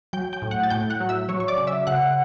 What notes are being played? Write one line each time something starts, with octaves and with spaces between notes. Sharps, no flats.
F#3 G5 G6
G5 G6
A2
F#5 F#6
A6
A2 G5 G6
F#5 F#6
F#3
E5 E6
F#3 C#5 C#6
C#6
D5 D6
C#3
E5 E6
C#3 F#5 F#6